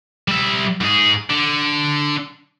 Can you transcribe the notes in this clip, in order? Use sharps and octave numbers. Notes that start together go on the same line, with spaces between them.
G3 E5
G#2 G#4
D3